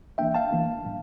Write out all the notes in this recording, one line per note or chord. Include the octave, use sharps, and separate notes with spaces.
E3 A#3 D4 E5 G5
F5 A5
E3 A#3 D4
A2 G3 D4